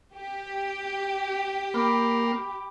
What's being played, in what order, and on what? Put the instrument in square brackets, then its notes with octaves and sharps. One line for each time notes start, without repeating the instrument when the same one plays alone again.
[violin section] G4
[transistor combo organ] A#3 [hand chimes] B5 D6 F6